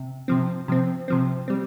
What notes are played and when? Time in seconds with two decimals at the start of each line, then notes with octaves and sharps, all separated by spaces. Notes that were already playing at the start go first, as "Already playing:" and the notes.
Already playing: C3
0.28 C3 F3 C4
0.68 C3 F3 C4
1.08 C3 F3 C4
1.48 G3 C4